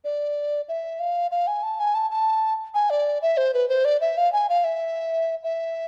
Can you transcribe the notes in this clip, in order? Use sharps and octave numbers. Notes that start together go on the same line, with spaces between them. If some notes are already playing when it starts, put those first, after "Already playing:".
D5
E5
F5
F5
G#5
A5
G#5
A5
A5
G#5
D5
E5
C5
B4
C5
D5
E5
F5
G#5
F5
E5
E5